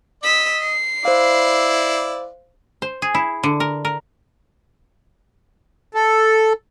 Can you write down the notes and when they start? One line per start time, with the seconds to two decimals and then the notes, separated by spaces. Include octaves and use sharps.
0.23 D#5 E6 B6
0.64 C7
1.05 E4 C5 D5 F5
2.82 C5
3.02 G#4
3.15 E4
3.43 D3
3.60 A#4
3.85 A#4
5.95 A4